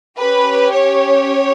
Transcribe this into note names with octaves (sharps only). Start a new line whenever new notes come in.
C#4 G4 B4
C#5